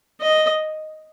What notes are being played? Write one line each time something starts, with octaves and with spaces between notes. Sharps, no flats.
D#5